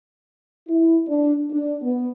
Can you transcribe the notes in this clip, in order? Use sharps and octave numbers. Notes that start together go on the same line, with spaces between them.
E4
D4
D4
B3